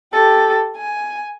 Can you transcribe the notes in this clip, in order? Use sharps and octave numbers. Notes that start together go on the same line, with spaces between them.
G4 A4
G#5